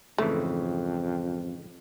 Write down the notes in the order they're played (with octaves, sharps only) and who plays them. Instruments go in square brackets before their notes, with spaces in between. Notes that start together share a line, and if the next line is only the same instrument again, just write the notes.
[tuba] F2 [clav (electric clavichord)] G#2 C#3 E3 [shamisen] A3